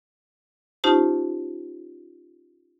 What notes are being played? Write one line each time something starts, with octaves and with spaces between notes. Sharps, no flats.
C#4 D#4 F4 G4 C5 A5